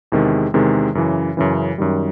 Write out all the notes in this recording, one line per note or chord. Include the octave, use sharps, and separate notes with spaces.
E2 C3 D#3 G#3
E2 C3 D#3 G#3
F#2 C#3 E3
F#2 C#3 E3
F#2 D#3 G3